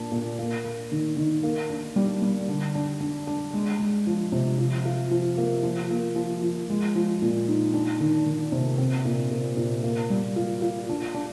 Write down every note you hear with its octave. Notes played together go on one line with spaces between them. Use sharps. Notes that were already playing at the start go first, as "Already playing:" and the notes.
Already playing: A#2 D4
A#2
A#3
A#3
D#3
D#3
A#3
D4
G3
G3
D3
D4
D4
D4
G#3
G#3
F3
C3
F3
F4
F3
A#3
F3
A#3
F3
F3
G#3
F3
A#2
D#4
D4
D#3
D#3
C3
C4
A#2
A#2
A#2
A#3
G3
F4
F4
D4
D4